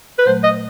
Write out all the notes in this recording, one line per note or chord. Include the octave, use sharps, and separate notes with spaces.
B4
A#2 F#3 A3 C5
D#5